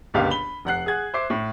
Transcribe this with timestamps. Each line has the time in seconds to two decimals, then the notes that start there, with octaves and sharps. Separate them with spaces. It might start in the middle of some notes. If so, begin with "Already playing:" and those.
0.14 G1 C#2 A#2 G4 F5
0.30 B5 G7
0.65 F1 F#5 F#6 C7
0.86 G#4 F#5 G#6
1.14 C5 E5 D6 C7
1.30 A2